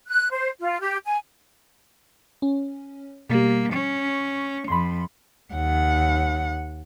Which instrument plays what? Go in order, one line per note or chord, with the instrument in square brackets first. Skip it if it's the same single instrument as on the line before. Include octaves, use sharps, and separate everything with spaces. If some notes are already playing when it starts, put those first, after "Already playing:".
[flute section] F#6
C5
F4
G4
G#5
[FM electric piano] C#4
[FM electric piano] B2 G3 [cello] A#3
[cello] C#4 [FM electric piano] C#6
[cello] F2 [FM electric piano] B5 C6
[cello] D#2 F#5